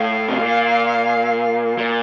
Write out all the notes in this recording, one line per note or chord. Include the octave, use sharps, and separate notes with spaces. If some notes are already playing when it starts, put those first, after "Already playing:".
Already playing: A2 F5
C3
A#2
A#2